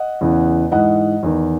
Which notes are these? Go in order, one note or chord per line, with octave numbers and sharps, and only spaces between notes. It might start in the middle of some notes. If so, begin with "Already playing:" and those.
Already playing: D#5 F#5
E2 C#3 E3
G#2 E3 D#5 F#5
E2 D#3